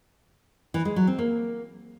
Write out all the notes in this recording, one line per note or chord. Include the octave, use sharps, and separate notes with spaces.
E3
G#3
F#3
C4
A#3